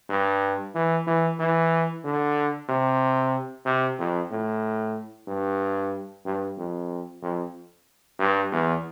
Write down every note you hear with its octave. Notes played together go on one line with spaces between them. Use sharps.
G2
E3
E3
E3
D3
C3
C3
F2
A2
G2
G2
F2
F2
G2
E2